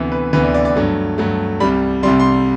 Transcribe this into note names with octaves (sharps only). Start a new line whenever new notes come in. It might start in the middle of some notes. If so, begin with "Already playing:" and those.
Already playing: D2 C3 E3 B3
B4
D2 C3 E3 B3 B4
D5
D5
D5
G2 F#3 A3
G2 F#3 A3
C2 C3 G3 B5
C2 C3 G3 C6
C6